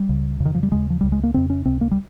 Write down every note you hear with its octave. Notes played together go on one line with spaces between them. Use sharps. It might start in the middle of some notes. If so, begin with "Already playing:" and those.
Already playing: G3
C#2 C#3
F2 C#3
D#3
F3
G3
D#2 C#3 G#3
F3
C#2 C#3 G3
G#3
A#3
F2 C#3 C4
C#4
C#2 C3 C4
A#3
G3